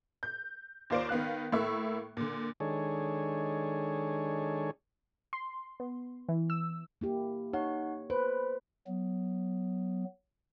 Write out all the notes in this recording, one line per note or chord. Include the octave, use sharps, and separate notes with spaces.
G6
D#2 F4 C5 D5 D7
D#3 B3 F5 F#6
A2 A#3 E5 C#6
A#2 D3
D#3 G#3 D4 G#4 A4 C#5
C6
B3
E3
E6
A#3 E4 G4
D#4 C#5 F#5
B4 C5
F#3 B3